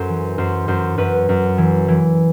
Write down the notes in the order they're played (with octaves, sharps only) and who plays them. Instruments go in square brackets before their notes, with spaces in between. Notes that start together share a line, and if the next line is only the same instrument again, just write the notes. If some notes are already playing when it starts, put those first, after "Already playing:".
Already playing: [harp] F#2 A4 C5
E3
F#2 C5
F#2 C5
F#2 B4
F#2
E3
E3